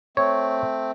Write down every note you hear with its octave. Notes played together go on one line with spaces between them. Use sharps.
A3 C4 C#5